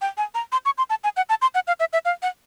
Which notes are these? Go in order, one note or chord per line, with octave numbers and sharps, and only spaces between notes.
G5
G#5
A#5
C6
C#6
C6
A5
G#5
F#5
A5
C6
F#5
F5
E5
E5
F5
F#5